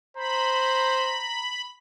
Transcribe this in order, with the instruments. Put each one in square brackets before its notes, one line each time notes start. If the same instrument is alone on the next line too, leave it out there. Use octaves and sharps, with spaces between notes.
[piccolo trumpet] C5 [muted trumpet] A#5 [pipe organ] B5